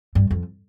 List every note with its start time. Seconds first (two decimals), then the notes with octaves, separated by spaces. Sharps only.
0.15 G2
0.31 F2